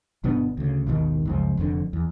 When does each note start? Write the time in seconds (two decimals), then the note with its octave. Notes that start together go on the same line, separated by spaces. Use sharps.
0.24 G1 B2 B3 D4
0.57 D2 C#3
0.87 G#1 D#2 B2 D#3
1.25 F#1 C#2 F3
1.57 F1 F2 A#2 D3
1.93 E2